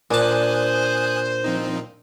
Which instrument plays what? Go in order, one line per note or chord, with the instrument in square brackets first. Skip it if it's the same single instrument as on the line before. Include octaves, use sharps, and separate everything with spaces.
[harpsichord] A#2 A5 [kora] D4 [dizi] C5 [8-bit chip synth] G#5 D#6 F#6
[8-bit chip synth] F3 C4 D#4